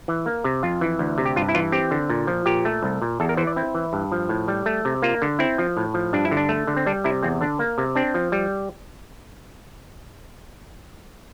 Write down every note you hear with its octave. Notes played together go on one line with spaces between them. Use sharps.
E3
A#3
C3
F2 F4
E3
D2
C3
G4
G2 F4
E4
E3 F4
C4 G4
D3
A#2
F3
A#2 G4
A3
C2
A#2
E2 A4
A#4
E3 C5
D5
C4 E4
E3
G2
F3
A2
G3
A3
C3
A#3 F4
D3
C4 E4
F3
A2
F3
G2 D4
E4
D3
D4
A3
D3
C4
G3 D4
C3 E4
E2 C4
D3 D4
A#3
C3
C4 D4
F3
G3